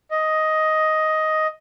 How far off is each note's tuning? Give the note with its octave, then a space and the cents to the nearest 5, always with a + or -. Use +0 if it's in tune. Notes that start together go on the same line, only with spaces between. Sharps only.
D#5 +10